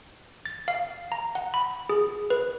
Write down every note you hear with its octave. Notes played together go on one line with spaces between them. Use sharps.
A6
F5
A#5
F#5
B5
G#4
B4